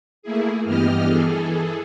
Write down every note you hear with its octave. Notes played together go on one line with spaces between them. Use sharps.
A3 A#3 E4 G#4
G2 E3 B3 G4 D#5 F6
E3 G#4 A4